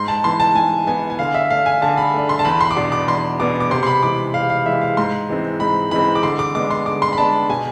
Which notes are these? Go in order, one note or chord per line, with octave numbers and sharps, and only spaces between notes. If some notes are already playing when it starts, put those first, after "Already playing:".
Already playing: G#2 C6
A5
E3 B3 C6
A5
G#2 G#5
E3 B3 G#5
G#5
D3 F5
E5
A3 D4 F5
G#5
D3 A5
B5
A3 D4
C6
A5
E2 B5
C6
D6
B2 B3 D4 C6
D6
E2 C6
B2 B3 D4 D6
D6
C3 C6
C6
B5
E3 G#3 D6
C3 F5
F5
E3 G#3 E5
F5
G#2 C6
E3 G#3 C4
G#2 B5
E3 G#3 C4 B5
D6
D3 C6
D6
G#3 B3 D4 D6
C6
D3 D6
C6
B5
G#3 B3 D4 A5
B2 G#5